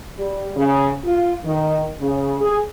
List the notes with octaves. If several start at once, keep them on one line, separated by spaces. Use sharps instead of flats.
G3
C#3
F4
D#3
C#3
G#4